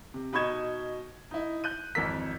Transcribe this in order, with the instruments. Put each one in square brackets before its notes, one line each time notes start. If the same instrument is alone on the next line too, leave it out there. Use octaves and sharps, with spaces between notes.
[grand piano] C3
B2 D#4 B5 C#6 G#6 E7
D#4 E4
F#6 G6 D#7
G#1 F2 E3 A#4 E6 B6